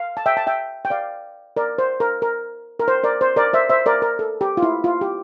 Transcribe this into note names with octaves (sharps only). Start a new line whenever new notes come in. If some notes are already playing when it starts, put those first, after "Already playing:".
Already playing: F5
A5
E5 G5
A5
E5 G5
G5
D5 F5
A#4 D5
C5
A#4
A#4
A#4
C5
A#4 D5
C5
A#4 D5
C5 E5
C5 E5
A#4 D5
A#4
A4
G4
F4
E4
F4
G4